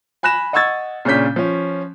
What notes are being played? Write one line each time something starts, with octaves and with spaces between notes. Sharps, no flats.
G#5 B5 F#6 A#6 E7
D#5 F#5 C#6 E6 G#6 A6
A#2 C#3 D4 C#5 G6 B6
F3 C#4